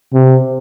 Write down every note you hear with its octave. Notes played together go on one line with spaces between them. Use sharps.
C3